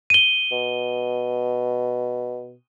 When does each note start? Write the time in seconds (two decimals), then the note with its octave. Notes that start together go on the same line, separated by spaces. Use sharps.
0.10 D#7 G7
0.52 B2